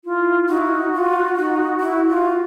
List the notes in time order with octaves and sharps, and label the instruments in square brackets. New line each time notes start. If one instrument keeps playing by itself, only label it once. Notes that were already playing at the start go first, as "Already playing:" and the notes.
[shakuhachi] E4 [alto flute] F4
[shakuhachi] D#4 [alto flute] F#4
[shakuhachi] E4
D#4
F4
D#4
E4
F4